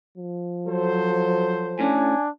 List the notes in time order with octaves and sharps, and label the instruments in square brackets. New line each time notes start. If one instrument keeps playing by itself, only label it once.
[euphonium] F3
[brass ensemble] F#3 A4 C5
[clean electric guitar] A2 C#4 [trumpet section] D4 G#5